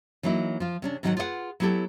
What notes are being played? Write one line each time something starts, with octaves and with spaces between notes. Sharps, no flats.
E3 F#3 A#3 D#4 E4
F3 F4
C3 C#4 D4
G#2 D#3 F#3 D#4 F#4 F#5
F4 G#4 B4 D5 F#5
F#3 B3 E4 G4 A4